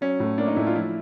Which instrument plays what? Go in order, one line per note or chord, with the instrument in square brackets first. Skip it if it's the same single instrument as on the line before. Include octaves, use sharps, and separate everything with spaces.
[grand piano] F#3 C#4
A2
A#3 D4
D#4
A2 E4
F4
F3 E4